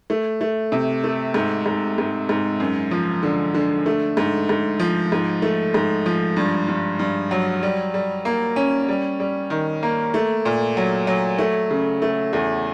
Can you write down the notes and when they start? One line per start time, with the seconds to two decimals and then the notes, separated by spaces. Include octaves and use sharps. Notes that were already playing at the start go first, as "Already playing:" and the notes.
0.10 A3
0.41 A3
0.72 C3
1.04 A3
1.34 G#2
1.66 G#2
1.98 G#2
2.29 G#2
2.60 F#2
2.91 F3
3.23 D3
3.54 D3
3.86 A3
4.17 G#2
4.49 G#2
4.80 F3
5.12 G#2
5.42 A3
5.74 G#2
6.06 F3
6.37 G2
6.68 G2
6.99 G2
7.31 F#3
7.63 G3
7.94 G3
8.25 A#3
8.56 C#4
8.89 G3
9.20 G3
9.50 D#3
9.83 A#3
10.14 A3
10.45 A#2
10.77 F#3
11.07 F#3
11.38 A3
11.71 C#3
12.02 A3
12.33 E2